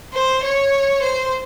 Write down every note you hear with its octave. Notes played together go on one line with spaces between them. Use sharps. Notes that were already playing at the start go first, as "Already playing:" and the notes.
C5
C#5
C5